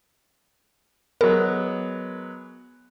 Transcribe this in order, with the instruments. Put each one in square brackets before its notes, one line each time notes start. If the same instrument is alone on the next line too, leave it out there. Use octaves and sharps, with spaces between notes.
[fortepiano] F#3 G#3 B3 [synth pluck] A#4